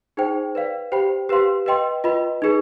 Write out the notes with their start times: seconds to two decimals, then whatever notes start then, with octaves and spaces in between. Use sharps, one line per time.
0.17 D#4 G#4 C5 G5
0.55 B4 D5 F5
0.92 G4 C5 G5 B5
1.29 G4 B4 F5 C6
1.66 B4 D#5 G5 C6
2.04 F4 B4 D#5 B5
2.42 D#4 G#4 B4